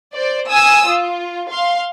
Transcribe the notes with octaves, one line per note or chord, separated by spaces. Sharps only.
C5 D5
G#5 D#6 E6
F4
F5 C6